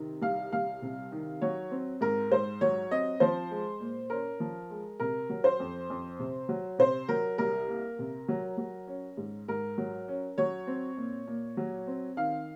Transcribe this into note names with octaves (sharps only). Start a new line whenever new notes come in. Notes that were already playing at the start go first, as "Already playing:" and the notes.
Already playing: C3 D#3
C2 F5
C2 F5
C3
D#3
F#3 C#5
C4
G#2 A#4
G#2 C5
F#3 C#5
C4 D#5
F3 C5
G#3
A#2
C#4 A#4
F3
G#3
C3 A#4
F#3
C5
F2
F2
C3
F#3
C3 C5
F#3 A#4
C2 A#4
A#3
C3
F#3
F#3
C#4
G#2
G#2 A#4
F#3
C#4
F#3 C#5
C4
A#2
A#2
F#3
C4
D#3 F5